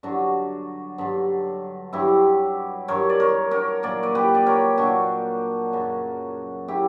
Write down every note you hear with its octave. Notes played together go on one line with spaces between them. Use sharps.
G2 D3 F#3 D4 F#4
G2 D3 F#3
G2 F#3 E4 G4
G2 F#3 A#4 C#5
D5
A#4 C#5
A#4 C#5
A#2 F#3 D5
B4 D5
G4 B4
D5
A#4 C#5
A#2 F#3 D4 F#4
F#2 C#3 F#3
C#3 F#3 E4 G4